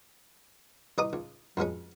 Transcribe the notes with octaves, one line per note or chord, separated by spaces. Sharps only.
C2 B4 D#5 A#5 D6 D#6
C#2
F2 B2 G#3 C#4